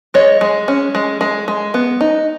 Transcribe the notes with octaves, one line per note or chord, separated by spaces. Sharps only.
G#3 C#5 D#5
G#3
C#4
G#3
G#3
G#3
B3
D#4